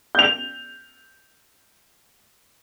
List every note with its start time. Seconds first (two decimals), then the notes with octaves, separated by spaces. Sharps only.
0.15 G6 F7